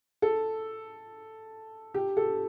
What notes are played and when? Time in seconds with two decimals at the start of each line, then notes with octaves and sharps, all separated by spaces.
0.22 A4
1.94 G4
2.17 A4